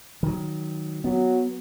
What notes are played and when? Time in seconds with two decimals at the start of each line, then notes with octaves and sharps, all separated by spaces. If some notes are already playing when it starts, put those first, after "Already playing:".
0.23 D#3 F#3
1.04 F#3 B3